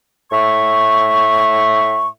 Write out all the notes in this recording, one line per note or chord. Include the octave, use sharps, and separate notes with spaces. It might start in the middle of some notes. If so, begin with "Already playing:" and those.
A2 E5 C#6